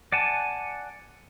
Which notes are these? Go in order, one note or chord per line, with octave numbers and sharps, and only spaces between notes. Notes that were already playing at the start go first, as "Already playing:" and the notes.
D5 F#5 G#5 A5